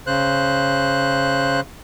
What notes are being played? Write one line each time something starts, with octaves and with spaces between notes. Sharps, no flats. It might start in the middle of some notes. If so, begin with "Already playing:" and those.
C#3 C5 F#6